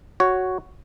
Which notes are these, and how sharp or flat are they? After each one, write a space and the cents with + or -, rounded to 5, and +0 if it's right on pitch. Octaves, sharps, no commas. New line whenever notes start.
F#4 +5 C#5 +0